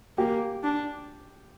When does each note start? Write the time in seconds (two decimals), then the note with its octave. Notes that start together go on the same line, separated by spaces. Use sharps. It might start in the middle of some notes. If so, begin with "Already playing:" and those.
0.18 A#3 G4
0.64 D4